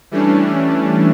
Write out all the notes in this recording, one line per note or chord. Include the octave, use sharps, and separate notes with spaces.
E3 G3 A3 C#4 D4